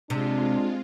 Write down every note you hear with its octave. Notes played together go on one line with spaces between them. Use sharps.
C3 G#3 D4 F4